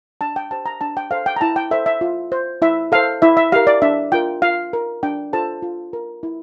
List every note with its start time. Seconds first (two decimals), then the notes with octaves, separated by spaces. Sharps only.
0.21 D4 A5
0.36 G5
0.51 G4 C5 A5
0.66 A#5
0.81 D4 A5
0.97 G5
1.11 A4 C5 F5
1.26 G5
1.36 A#5
1.41 E4 A5
1.56 G5
1.71 A4 C5 E5
1.86 E5
2.01 F4
2.32 C5
2.62 E4 E5
2.92 A4 C5 F5
3.22 E4 E5
3.37 E5
3.52 G4 A#4 F5
3.67 D5
3.82 D4 E5
4.12 F4 A#4 G5
4.42 F4 F5
4.73 A#4
5.03 D4 G5
5.33 F4 A4 C5 A5
5.62 F4
5.93 A#4
6.23 E4